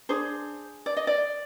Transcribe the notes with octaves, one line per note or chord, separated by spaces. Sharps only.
D4 G#4 C5
D5
D#5
D5